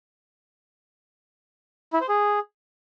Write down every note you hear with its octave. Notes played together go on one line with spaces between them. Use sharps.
E4
C5
G#4